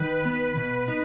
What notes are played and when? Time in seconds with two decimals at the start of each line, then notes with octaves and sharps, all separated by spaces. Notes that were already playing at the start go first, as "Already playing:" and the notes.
Already playing: D#3 B4
0.25 B3
0.56 B2
0.88 D#4